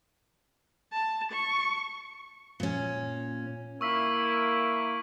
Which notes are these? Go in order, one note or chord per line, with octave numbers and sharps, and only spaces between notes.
A5
C#6
A#2 C#4
A#3 E4 C#6 E6 B6